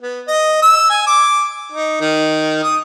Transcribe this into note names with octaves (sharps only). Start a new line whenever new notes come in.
B3
D#5
E6
G#5
D6
D#4
D#3
D#6